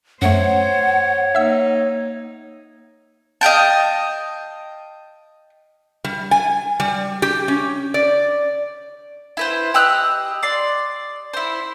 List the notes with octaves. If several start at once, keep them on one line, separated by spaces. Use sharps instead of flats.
F#2 A3 C5 C#5 F#5
A#3 D#4 E5 E6
D#5 F5 G5 A5
G3
G#5
G3
G4
C#4
D5
E4 B4 C5
G4 D#5 E6 F#6
D5 C6
E4 C5